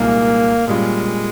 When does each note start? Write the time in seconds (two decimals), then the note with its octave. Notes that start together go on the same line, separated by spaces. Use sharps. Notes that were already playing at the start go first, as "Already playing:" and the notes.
Already playing: C2 A#2 G#3 A#3 D#4 A#4
0.67 A#2 G3 G#3 C#4 F4